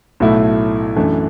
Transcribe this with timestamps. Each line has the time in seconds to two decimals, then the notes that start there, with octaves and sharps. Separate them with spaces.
0.20 B1 A2 F#3 A3 E4
0.96 F#2 E3 A3 D4